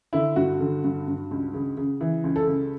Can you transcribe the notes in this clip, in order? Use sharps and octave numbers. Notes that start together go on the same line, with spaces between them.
D3 E4
G2 F#4
D3
G2
G2
C#2
C#3
C#3
E3
C#2
A4
C#3